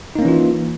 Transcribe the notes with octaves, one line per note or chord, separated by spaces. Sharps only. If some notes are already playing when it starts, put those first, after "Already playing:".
E3 A#3 C#4 D#4 F4